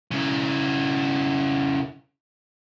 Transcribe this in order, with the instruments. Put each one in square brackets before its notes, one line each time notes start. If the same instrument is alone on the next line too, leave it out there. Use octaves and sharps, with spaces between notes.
[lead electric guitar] C#3 E4